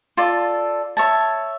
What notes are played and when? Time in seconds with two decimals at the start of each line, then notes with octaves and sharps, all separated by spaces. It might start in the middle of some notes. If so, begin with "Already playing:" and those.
0.17 F4 A4 D5
0.97 C#5 E5 A5